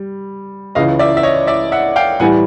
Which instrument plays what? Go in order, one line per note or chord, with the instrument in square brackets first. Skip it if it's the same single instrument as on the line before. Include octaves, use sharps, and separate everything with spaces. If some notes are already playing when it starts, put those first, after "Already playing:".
Already playing: [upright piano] G3
[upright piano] C#2 C#3 E3 [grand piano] D#5 F5
[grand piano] D5 E5
E5
C#5 D#5
D5 E5
E5 F#5
F5 G5
[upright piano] A2 E3 G3 [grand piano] F#5 G#5